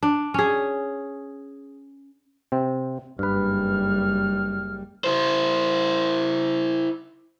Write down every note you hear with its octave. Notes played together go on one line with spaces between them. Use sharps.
D4
C#4 G#4
C3 C4
F#1 G2 G3 B4 F6
E4 C5